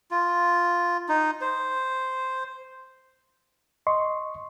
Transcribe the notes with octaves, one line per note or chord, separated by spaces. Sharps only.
F4
D#4
C5
D#5 C6 C#6